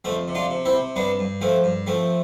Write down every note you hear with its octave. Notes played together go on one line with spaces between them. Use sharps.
F2 A3 C4
C3
D4 F4
C3
C4 E4
C3
G2 B3 D4
G2
F3 A3 C4
G2
F3 A3 C4